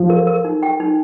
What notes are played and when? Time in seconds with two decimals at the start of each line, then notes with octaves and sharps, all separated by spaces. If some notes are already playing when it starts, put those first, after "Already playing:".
Already playing: F3
0.10 A#4
0.27 A#4
0.45 D#4
0.63 G5
0.80 D#4